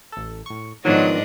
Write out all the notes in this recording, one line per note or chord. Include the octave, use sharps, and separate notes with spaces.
A1 A4
A2 C#6
G#2 D#3 F3 F#3 B3 D4 D#5